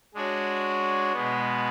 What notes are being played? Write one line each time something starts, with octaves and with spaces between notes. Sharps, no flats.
G#3 D4 F#4 C#5
B2 G#3 B3